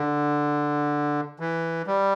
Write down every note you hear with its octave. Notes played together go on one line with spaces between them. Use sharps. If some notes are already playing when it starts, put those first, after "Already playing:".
Already playing: D3
E3
G3